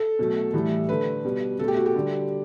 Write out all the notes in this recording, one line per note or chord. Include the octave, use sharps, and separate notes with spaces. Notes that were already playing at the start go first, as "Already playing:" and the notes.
Already playing: A4
B2 F#3 A3
A2 E3 G3
D3 A3 B4
B2 G3
B2 A3 A4
G4
F#4
G4
D3 G3